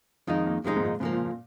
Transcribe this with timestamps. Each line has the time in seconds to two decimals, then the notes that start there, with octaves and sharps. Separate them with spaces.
0.27 F2 D#3 G#3 D#4 F4
0.46 A#3
0.64 F2 C3 D#3 G#3 D#4
0.77 G#2
0.83 A#2
1.00 G#2 C#3 F3 A#3
1.12 A#2
1.25 A#2